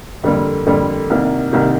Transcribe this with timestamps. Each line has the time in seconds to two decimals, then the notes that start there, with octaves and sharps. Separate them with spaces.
0.24 F2 D3 G3 A#3
0.66 F2 D3 G3 A#3
1.10 C2 C3 D#3 A#3
1.53 C2 C3 D#3 A#3